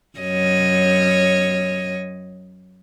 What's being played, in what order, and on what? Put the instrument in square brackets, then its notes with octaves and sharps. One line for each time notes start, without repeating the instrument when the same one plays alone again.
[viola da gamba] F#2 C#5 D#5